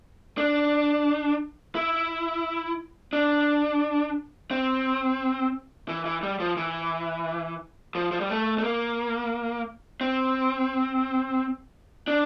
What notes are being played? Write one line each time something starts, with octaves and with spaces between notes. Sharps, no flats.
D4
E4
D4
C4
E3
E3
G3
F3
E3
F3
F3
G3
A3
A3
A#3
C4
D4